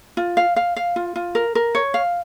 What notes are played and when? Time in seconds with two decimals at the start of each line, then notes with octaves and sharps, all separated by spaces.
0.17 F4
0.37 F5
0.56 F5
0.76 F5
0.96 F4
1.16 F4
1.35 A#4
1.55 A#4
1.75 C#5
1.94 F5